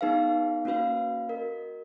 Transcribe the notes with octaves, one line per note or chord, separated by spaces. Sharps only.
B3 D#4 G#4 B4 F5
A#3 C#4 F#4 B4 F5
F#4 A#4 D#5